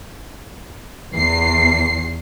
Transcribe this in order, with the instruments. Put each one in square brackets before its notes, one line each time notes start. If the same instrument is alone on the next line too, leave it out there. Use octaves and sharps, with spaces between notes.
[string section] E2 C7